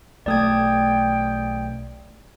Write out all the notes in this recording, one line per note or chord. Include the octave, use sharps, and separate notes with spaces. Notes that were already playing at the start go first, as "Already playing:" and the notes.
B1 A3 D5 G5 D#6 G#6